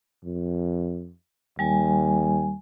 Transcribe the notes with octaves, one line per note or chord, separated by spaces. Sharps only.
F2
D#2 G3 G#5